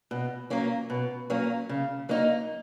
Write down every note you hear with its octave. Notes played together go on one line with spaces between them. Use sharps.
B2
F#3 A#3 C#4
B2
F#3 A#3 C#4
C#3
F#3 A#3 D#4